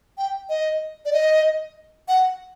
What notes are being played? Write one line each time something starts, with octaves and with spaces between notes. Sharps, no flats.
G5
D#5
D5
D#5
F#5